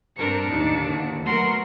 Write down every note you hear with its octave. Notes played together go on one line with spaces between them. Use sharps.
G2 C4 D4 A#4 C#7
D#2 A2 D#4
E2 D3
F#3 A3 B3 F#4 A#4 C6